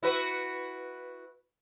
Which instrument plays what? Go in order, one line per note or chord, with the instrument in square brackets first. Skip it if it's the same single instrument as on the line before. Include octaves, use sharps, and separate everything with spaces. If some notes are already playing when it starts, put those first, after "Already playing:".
[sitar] E4 F#4 B4